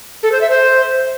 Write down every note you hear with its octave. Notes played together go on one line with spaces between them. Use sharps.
A4
C5
E5
C5